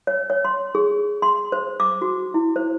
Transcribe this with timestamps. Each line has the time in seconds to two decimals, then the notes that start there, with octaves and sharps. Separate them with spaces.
0.07 C#5
0.30 C#5
0.45 C6
0.75 G#4
1.22 C6
1.52 C5
1.80 D6
2.02 F#4
2.34 E4
2.56 C5